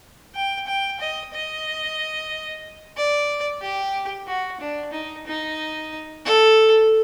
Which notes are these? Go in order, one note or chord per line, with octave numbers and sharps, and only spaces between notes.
G5
G5
D#5
D#5
D5
G4
F#4
D4
D#4
D#4
A4